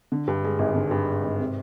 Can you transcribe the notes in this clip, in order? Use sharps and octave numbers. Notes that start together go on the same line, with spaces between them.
D3
G2
G#3
G#1
D3
G2
G#3
G#1
C3